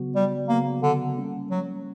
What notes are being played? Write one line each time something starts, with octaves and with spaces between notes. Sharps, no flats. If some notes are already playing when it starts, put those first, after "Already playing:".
Already playing: C#3 F#3 B3 F#4
G3
C#3 F#3 A#3 B3 F#4
D3
G3 A#3 C#4
F#3